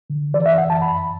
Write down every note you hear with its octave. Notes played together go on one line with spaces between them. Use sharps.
D3
E3 D5
E5
F#2 F#5
A5
F#2 B5